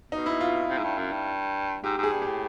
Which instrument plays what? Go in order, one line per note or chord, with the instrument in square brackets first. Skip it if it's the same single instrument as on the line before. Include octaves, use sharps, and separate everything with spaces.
[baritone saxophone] B2 [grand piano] D#4
[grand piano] E4
F4
[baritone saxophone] C3
G#2
G2
F#2
G2
[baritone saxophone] G#2 [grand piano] G4
[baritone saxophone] G#2
[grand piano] G#4
[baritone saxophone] G2
[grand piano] G4
[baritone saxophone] A2